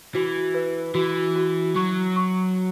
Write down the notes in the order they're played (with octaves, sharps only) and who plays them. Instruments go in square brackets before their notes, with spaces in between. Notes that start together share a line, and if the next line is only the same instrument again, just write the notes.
[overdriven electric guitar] E3 [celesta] F#4
[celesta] B4
[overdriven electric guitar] E3 [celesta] F#4
[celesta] F#4
[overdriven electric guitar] F#3 [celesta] C#6
[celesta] C#6